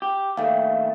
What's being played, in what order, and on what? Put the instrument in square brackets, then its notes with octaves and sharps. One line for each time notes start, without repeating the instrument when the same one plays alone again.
[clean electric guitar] G4
[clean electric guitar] D#2 A3 [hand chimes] F5 G5